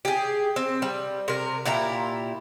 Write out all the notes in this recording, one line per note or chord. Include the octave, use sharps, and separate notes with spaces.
G4 G#4
C4
G3
C3 A#4
A#2 E4 G4 A#5